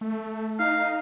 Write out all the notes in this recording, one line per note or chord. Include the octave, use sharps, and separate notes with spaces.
A3
D#4 F5